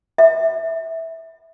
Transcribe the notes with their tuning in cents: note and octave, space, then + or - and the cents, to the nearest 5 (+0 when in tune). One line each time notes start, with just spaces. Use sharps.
E5 -10